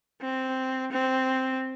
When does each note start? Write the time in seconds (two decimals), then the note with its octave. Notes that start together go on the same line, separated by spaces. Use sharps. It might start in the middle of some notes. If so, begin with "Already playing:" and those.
0.21 C4
0.91 C4